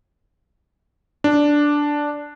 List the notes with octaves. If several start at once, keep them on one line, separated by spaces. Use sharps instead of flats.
D4